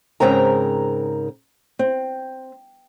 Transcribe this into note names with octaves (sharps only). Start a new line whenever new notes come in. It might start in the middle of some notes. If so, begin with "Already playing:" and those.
G#2 C#3 C4 A#4 A#5
C4